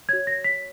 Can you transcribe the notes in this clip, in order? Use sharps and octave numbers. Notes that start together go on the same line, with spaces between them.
F#4 C#5 G#6
A#6
B6